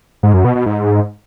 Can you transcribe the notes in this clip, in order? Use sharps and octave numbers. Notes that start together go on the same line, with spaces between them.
G#2
F#2
B2
B2
G#2